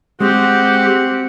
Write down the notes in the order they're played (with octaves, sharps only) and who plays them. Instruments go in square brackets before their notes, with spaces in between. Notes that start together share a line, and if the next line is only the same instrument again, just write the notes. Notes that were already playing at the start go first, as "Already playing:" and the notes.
[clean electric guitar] G#3 [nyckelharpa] C4 F#5 [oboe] F#4 [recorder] G4